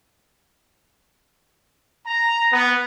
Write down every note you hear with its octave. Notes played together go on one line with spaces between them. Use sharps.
A#5
B3